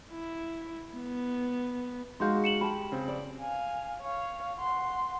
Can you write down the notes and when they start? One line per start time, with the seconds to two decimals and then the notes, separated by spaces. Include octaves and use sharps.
0.11 E4
0.93 B3
2.20 G#3 D#4 F#4 F5 C6 G6
2.44 C#7 E7 F#7
2.61 G4 A5 B5
2.92 C#3 C4
3.08 D5
3.40 F5 G#5
4.02 C#5 F5
4.58 F#5 C6